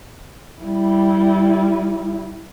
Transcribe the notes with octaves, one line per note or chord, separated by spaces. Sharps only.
G3 E4